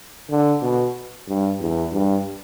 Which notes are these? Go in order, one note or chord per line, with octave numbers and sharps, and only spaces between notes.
D3
B2
G2
E2
G2